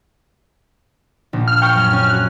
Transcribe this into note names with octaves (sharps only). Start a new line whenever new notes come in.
A#1
F6
G5 C#6 C#7
F#2
C#4
F#4 F#6